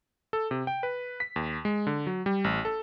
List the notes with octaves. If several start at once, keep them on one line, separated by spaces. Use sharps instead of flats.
A4
C3
G5
B4
B6
D#2
G#3
D3
F#3
G3
A1
A4